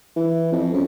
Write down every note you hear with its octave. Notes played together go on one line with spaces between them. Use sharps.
E3
F2
F#2